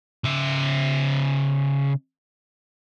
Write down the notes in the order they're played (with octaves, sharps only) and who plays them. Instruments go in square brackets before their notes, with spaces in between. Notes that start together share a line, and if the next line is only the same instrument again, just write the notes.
[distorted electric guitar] C#3 E5